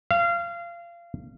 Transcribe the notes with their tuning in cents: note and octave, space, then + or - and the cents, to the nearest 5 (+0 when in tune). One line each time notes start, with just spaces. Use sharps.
F5 -25